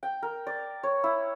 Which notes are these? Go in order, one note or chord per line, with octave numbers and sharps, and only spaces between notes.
G5
A#4
D5
C#5
E4